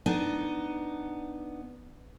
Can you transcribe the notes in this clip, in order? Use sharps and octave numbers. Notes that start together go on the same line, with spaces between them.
B3 D4 D#4